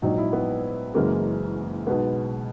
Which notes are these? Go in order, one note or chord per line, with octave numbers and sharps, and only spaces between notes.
A#1 G#2 F#3 D#4
E4
B3
F#1 F#2 C#3 E3 G#3 A#3
B1 B2 G#3 B3